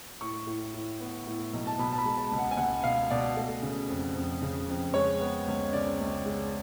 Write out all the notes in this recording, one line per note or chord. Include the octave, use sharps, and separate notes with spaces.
A2 C#6
A2
A2
B3
A2
B1
A5
B2 B5
A5
B5
G#3
A5
C#2
F#5
G#5
C#2 F#5
B2 F5
B2 D5
A3
C#3
F2
F2
C#3
F2
G#3 C#5
B3
C#2
C#3 D5
C#2
G#3